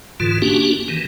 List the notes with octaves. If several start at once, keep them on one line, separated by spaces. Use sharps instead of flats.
G#2 D3 E3 F4
A#3 C#4 D4 F#4 G4
D#3 E3